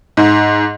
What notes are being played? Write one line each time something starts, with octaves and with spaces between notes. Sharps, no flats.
G#2